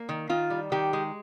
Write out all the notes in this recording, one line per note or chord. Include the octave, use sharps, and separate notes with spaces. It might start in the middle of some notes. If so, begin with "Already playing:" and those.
Already playing: A#3
D#3
D#3 F4
G3
D#3 G4
G#3